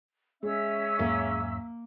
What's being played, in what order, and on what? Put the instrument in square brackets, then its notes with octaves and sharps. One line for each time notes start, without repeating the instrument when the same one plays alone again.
[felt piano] G#3 [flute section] C#4 E5 E6
[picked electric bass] E2 G#2 F#3 [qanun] A#3